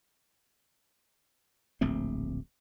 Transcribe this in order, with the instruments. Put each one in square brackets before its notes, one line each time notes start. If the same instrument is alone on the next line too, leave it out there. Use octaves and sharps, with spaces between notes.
[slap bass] D1 A#1 A3 C4